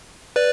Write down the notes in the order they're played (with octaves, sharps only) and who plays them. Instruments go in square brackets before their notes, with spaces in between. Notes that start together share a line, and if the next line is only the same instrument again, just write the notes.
[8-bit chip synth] B4 D5